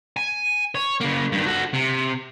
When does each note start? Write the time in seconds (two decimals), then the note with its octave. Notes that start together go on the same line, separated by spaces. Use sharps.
0.17 G#5
0.75 C#5
1.00 C#3 A#3
1.32 G2 D#3
1.46 F#4 A4
1.73 C3